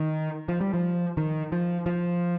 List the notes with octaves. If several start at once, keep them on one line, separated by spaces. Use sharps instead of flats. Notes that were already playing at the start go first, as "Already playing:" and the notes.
Already playing: D#3
F3
G3
F3
D#3
F3
F3